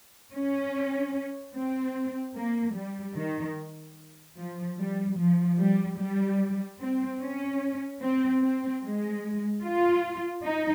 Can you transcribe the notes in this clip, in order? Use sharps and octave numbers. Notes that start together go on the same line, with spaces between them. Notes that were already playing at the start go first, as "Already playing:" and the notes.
C#4
C4
A#3
G3
D#3
F3
G3
F3
G3
G3
C4
C#4
C4
C4
G#3
F4
D#4